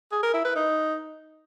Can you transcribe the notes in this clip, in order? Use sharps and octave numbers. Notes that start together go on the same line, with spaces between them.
G#4
A#4
E4
B4
D#4